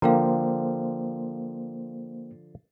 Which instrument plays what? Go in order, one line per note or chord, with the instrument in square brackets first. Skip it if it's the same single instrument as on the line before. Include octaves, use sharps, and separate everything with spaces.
[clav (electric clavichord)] D3 F3 [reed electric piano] A#3 C5 [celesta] F5 G5 A#5